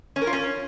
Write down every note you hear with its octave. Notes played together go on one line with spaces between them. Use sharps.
C#4
A#4
F4
C#4